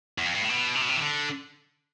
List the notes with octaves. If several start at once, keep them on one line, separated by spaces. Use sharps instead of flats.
E2
F2
G2
A2
B2
C3
B2
C3
E3
D3